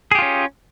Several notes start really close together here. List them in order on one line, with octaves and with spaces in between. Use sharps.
G#4 G4 F4 C#4